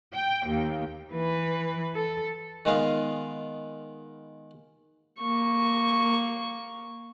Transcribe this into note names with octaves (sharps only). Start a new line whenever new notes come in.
G5
D#2
E3 B4
A4
D#3 G#3 B3 F4 F5
A#3 C#6